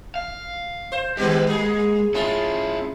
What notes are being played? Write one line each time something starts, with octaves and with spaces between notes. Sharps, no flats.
F5
C5
D#3 G#3 B3 G4
A#3 G#4
G#3 C#4 E4 F4